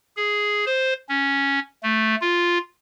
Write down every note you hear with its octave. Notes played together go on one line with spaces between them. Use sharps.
G#4
C5
C#4
A3
F4